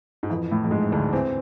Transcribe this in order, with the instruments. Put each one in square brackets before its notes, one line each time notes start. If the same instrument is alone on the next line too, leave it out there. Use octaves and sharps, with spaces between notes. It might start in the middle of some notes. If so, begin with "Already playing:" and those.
[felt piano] G#2
[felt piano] F2 [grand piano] E3
[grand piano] A2
[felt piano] F2
[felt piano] G#2 [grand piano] G#3
[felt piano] D2 D3 [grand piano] D4
[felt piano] E2 E3 [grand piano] C4